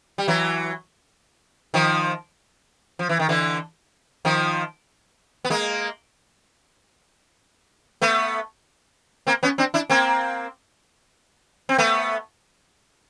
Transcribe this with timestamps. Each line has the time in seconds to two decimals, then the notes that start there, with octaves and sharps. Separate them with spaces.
0.18 G3
0.28 E3 F#3
1.74 D#3 F3
2.99 F3
3.09 E3
3.19 D#3
3.29 D3 E3
4.25 D#3 F3
5.45 B3
5.50 G#3 A#3
8.02 A3 B3
9.27 A#3 C4
9.43 B3 C#4
9.58 C4 D4
9.74 D4 E4
9.90 A#3 C4
11.69 C4
11.78 A3 B3